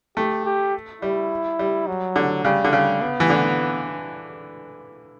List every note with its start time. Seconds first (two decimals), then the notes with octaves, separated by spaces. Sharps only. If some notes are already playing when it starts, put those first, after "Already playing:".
0.17 A3 G4
0.45 G4
1.02 G3 E4
1.59 G3
1.87 F#3
2.16 D3
2.45 C#3 G3
2.64 D3
2.73 C#3 G3
3.02 B3
3.20 E3
3.30 D3